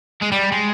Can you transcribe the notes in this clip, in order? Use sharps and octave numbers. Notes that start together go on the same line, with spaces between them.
G#3
G3
G#3